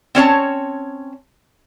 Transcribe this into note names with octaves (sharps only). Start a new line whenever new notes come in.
C4 C#4 C#5 A5